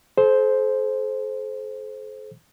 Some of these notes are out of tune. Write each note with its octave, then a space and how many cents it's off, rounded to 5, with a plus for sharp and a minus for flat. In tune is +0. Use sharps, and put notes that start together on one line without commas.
A4 -40 C5 +0